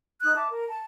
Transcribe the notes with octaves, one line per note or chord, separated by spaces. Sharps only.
D#4 D#6 F#6
E5 A5 D6
A#4
A5